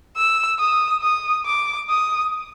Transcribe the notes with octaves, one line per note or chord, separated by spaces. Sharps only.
E6
D#6
D#6
D6
D#6